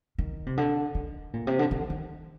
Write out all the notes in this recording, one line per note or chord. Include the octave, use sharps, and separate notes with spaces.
D#3
C3
D3
D#3
A#2
C3
D3
D#3
D#3